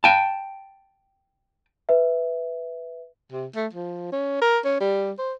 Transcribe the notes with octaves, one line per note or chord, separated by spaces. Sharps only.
G5 A5
B4 E5
C3
A3
F3
C#4
A#4
C#4
G3
C5